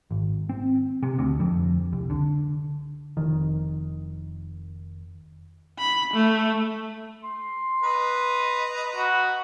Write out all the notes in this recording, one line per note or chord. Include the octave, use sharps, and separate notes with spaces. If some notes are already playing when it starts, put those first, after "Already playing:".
G#1
C4
C3
D2
F2
C2
D3
F1 D#3
B5
A3
C6
B4 D#5 A#5
F#4